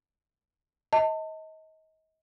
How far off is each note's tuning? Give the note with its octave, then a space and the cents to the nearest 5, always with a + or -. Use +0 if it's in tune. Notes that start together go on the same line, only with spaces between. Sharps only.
D#5 +30 A5 +30